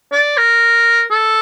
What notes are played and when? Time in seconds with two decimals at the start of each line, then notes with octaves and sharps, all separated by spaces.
0.12 D5
0.37 A#4
1.10 A4